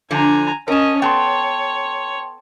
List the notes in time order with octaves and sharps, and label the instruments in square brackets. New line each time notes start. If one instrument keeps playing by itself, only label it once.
[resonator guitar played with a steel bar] D3 F3 D4 [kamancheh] G#5 A#5
[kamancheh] C#4 D#5 [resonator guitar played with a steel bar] A#4 A5
[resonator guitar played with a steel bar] B3 A4 [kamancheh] C#5 [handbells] G5 A5 C6